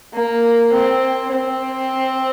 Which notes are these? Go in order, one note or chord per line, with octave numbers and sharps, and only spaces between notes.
A#3
C4
C4